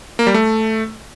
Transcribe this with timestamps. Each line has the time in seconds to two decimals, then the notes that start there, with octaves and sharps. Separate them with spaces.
0.19 A#3
0.27 G3
0.34 A3